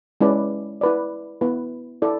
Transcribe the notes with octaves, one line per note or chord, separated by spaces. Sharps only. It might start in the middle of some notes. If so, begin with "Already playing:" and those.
G#3 C#4 E4 B4 D5
E4 B4 D5
B3 E4 B4
E4 A4 D5